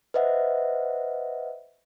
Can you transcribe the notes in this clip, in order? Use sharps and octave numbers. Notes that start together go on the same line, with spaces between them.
B4 C5 D#5 E5 F#5